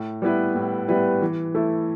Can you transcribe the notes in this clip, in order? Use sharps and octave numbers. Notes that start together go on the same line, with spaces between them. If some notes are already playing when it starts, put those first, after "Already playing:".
Already playing: A2
G3 B3 E4 B4
A2
G3 B3 E4 B4
E3
A3 E4 A4